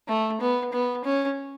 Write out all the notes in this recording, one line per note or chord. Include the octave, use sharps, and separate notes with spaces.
A3
B3
B3
C#4